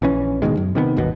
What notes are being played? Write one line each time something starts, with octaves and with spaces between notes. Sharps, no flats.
A#1 E3 C#4
D1 B2 D#3 G#3
F#2
C3 D#3 G#3 B3
D#1 G#1 D#2 B2